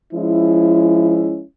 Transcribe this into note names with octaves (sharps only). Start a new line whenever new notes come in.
F3 G#3 C#4 E4